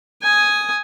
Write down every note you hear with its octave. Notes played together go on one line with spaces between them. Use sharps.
G#5 D#6